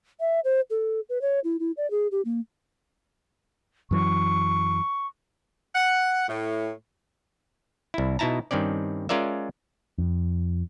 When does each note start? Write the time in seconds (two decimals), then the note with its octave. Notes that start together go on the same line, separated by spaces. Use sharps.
0.20 E5
0.45 C5
0.70 A4
1.09 B4
1.22 C#5
1.44 E4
1.60 E4
1.77 D5
1.91 G#4
2.12 G4
2.25 A#3
3.91 F#2 E3 F#3 C#6
5.75 F#5
6.29 A2
7.94 C2 E4
8.19 B2 D#4 E4 A5 A#5
8.51 G2 D#3 C4 C#4 D5
9.09 G#3 C#4 F4 A#4 D5 E5
9.98 F2